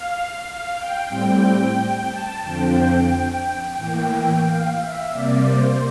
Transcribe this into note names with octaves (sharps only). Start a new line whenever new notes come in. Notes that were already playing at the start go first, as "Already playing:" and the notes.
Already playing: F5
F5
G5
A2 G3 C4 G5
G5
A5
F2 D3 F3 C4 G5
A2 E3 A#3
F5
E5
C3 G3 A#3 D5
C5